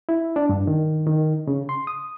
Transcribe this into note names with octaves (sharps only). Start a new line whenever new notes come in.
E4
D4
G2
D#3
D#3
C#3
C6
D#6